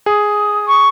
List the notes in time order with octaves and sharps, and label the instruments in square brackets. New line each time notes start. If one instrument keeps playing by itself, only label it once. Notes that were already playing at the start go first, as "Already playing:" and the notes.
[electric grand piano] G#4 [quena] D#6
[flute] C#6